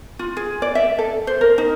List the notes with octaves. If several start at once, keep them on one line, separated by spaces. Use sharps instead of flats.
F4
G#4
D5
E5
A4
C5
A#4
D#4